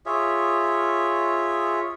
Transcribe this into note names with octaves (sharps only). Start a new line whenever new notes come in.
F4 G#4 C#5 E5